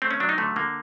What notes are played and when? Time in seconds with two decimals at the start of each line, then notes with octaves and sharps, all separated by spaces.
0.02 A3 C4
0.11 C#4
0.20 F#3 D4
0.29 D#4
0.38 D3 A3
0.56 D3 A#3